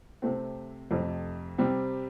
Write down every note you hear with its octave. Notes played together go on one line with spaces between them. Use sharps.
C3 A3 C4
F2 C3 A3
C3 G3 C4